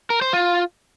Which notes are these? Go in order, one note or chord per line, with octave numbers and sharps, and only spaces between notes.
A#4
C5
F4